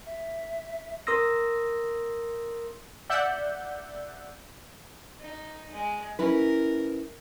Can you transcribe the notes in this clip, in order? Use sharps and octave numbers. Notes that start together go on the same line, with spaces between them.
E5
A#4 C6 D#6 E6 A#6
D5 E5 F#5 E6 F#6 G6
D#4
G#3
C#4 E4 A#4 B4